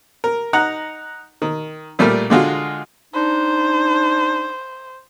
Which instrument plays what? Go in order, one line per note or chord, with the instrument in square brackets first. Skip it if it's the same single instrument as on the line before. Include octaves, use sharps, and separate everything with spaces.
[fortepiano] A#4
D#4 F#5 A#5
D#3
A#2 G3 A3 A#4 F6
D3 G#3 F4 F#4
[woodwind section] D4 D#4 [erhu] C5